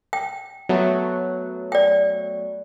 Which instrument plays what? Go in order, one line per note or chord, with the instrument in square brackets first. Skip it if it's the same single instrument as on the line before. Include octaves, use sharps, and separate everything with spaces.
[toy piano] G5
[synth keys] F#3 A3 B3
[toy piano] D5 G5